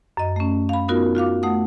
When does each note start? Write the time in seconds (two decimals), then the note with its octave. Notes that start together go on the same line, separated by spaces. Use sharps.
0.17 F#2 D#5
0.36 A3 C#4
0.69 F5 B5
0.88 B3 D#4 F4 F#4 A#4
1.15 F4 F#4 F5 D6
1.43 A3 F#5 D#6